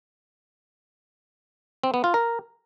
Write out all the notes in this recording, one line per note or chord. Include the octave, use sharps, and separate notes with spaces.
C4
B3
F4
A#4